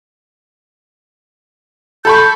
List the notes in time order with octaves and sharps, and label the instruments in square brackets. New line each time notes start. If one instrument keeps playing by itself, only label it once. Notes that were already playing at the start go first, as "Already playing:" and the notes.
[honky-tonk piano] A4 B5 C#6 [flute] G6